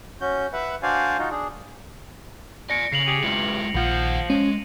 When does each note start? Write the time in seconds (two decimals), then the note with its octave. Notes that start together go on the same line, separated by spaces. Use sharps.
0.21 C#4 F#4 G6
0.53 B4 E5 F#5
0.83 D4 F#4 C5 D5 F5 G#5
1.18 D#4 F4 F#4
1.31 D4 G#4
2.70 D5 G#5 A#6 C#7 D7
2.92 C#3 C7 F7 F#7
3.06 G4 G#4
3.23 G2 G#3 E4 F4
3.74 A#1 D#3 F3 F#5
4.30 G#3 C#4 D#7